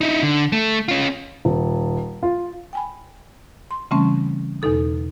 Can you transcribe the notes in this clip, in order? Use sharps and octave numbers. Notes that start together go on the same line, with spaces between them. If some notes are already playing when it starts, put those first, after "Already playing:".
D#4 E4
D3
A3
C#4 F4
D#1
F4
G5 G#5 B5
C6
C#3 E3 G3 A3 C4 C#4
E2 B2 D#4 A4 D#6